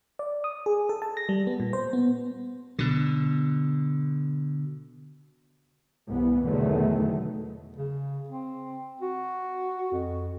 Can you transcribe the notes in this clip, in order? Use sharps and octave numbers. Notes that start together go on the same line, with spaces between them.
D5
D#6
G#4
A4
A5
A#6
G3
B3
A#2
C5
B3
B2 D3
C2 E3 B3
E2 B2 D3 D#3 F#3 A3
C#3
C4
F#4
F2